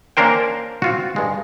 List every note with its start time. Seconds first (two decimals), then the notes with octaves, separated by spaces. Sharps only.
0.17 A#3 C#4 D4 A#4 C5 G5
0.82 C4 F4 F#4
1.16 G2 G#3